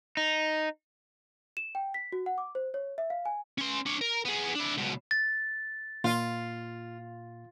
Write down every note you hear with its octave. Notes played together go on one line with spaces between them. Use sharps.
D#4
E7
G5
B6
F#4
F#5
D6
C5
C#5
E5
F5
G#5
C#4 C6
D4 C#5
A#4
B3 G#4
D4 E4
C#2 B2
A6
A#2 F4